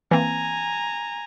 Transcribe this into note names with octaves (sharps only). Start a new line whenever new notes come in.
E3 A#3 C4 G#5 A#5